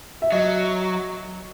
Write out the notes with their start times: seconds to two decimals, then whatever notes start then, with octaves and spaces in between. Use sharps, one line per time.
0.22 E5
0.32 F#3 D#5